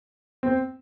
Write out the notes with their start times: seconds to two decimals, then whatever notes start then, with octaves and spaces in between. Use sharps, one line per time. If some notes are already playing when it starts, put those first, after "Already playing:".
0.43 C4